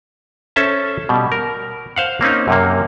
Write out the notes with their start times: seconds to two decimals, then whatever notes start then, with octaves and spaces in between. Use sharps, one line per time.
0.56 C#4 A4 C5 E5 A5
1.09 B2 G3
1.32 A#4
1.96 C5 F5 F#5
2.21 A#3 C4 C#4 D#4
2.48 F#2 C3 A#3